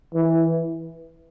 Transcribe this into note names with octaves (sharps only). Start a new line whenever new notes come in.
E3